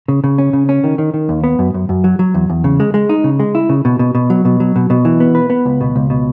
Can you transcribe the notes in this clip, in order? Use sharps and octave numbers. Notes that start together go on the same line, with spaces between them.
C#3
C#3
C#4
C#3
C#4
D#3
D#3
D#3
D#2
B3
F#2
F#2
F#2
F#3
F#3
E2
E2
C#3
G#3
G#3
D#4
C#3
G#3
E4
C#3
B2
B2
B2
F#3
B2
F#3
B2
B2
E3
B3
B4
B3
C#2
B2
C#2
B2